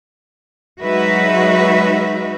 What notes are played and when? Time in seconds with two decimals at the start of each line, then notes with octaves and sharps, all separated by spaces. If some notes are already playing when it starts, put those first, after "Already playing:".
0.82 F#3 G#3 D#4 F#4 B4 E5